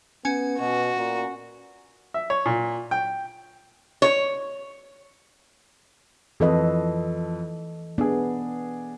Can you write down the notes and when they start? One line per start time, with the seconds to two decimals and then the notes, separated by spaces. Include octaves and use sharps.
0.25 B3 C#4 G#5
0.59 B2 F#4
0.97 A#2
2.14 E5
2.30 C#5
2.46 A#2
2.91 G5
4.02 C#5
6.40 F2 E3 A4 B4 D#5
7.98 B3 D4 G#4